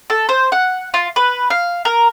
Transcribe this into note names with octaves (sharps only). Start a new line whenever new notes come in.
A4
C5
F#5
F4
B4
F5
A#4